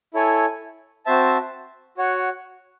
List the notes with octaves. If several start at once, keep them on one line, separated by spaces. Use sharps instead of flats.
E4 A4 C#5 G#5
C4 F#4 C5 E5 A5
F#4 C#5 F#5